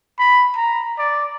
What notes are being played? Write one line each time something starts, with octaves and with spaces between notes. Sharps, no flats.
B5
A#5
D5